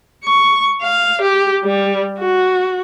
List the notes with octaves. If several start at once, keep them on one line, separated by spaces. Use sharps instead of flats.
C#6
F5
G4
G3
F#4